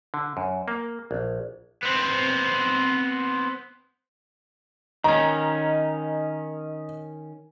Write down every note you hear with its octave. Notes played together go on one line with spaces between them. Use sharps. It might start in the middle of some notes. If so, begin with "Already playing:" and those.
D3
F#2
A#3
A#1
B3 C4
D#3 C#4 D#5 A#5